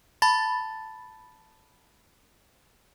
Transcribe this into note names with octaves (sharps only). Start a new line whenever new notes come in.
A5 B5 A6